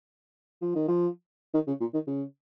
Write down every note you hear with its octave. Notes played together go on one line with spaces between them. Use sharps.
F3
D#3
F3
D#3
C#3
A#2
D#3
C#3